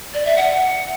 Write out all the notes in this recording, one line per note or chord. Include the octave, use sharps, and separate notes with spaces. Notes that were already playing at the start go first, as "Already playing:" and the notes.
D5
E5
F#5